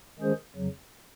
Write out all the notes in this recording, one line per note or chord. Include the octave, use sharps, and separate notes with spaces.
D#3 G#3 C#4 G#4 C5
F2 C#3 F#3